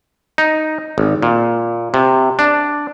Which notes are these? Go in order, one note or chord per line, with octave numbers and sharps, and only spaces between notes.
D#4
G#1
A#2
C3
D4